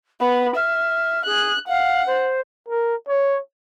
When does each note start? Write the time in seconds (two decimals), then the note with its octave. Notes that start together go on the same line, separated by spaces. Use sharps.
0.20 B3 B5
0.56 E5 F6
1.26 G#4 F#6
1.68 F5 F#5
2.06 C5
2.68 A#4
3.08 C#5